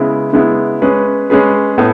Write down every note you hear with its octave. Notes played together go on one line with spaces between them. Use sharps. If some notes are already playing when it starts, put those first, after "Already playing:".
Already playing: C#3 G#3 B3 E4
C#3 G#3 B3 E4
G#3 C#4 G#4 B4
G#3 C#4 G#4 B4
A2 B3